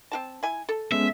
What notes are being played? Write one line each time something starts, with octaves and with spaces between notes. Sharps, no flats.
C4 F#4 A5
E4 G#5
A4
G#3 B3 C#4 E5